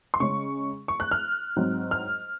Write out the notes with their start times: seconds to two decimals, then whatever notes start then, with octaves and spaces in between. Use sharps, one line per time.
0.14 C6
0.20 C#3 G#3 C#4 C#6
0.88 C#6
1.00 F#6
1.11 F6
1.56 G#2 F#3 C4
1.91 F6